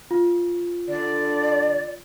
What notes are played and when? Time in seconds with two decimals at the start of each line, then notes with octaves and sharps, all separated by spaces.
0.11 F4
0.89 D3 D5